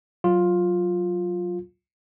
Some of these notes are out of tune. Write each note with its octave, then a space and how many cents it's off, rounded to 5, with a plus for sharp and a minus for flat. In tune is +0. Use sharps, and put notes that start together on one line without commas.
F#3 +0 F4 +10